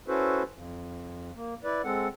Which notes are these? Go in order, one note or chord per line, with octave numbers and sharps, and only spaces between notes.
C#4 E4 F#4 A4 B4 C5
F2
A#3
E4 B4 D5
G#3 C4 A4 F#5